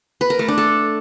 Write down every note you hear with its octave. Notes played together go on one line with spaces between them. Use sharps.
B4
A#4
A3
D4
A4